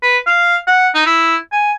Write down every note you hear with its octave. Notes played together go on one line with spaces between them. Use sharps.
B4
F5
F#5
D#4
E4
G#5